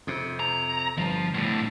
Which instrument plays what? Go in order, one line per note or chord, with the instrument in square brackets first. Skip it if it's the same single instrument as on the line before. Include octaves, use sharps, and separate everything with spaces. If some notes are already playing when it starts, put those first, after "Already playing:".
[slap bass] F2 C3
[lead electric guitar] A#5
[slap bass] G1 [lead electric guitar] F3
[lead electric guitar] D2 A2